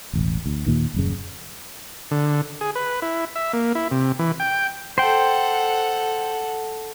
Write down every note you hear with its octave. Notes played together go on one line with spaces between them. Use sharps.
E1 A1
D2
D#2 A#2 D#3
D#1 F#2 C#3
D3
G#4
B4
E4
E5
A#3
E4
C3
E3
G5
A4 C5 F#5 G5